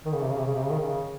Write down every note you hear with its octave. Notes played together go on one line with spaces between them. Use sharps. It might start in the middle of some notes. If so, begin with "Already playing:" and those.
D#3
C#3
C3
C#3
C3
C#3
C3
C#3
D#3
C#3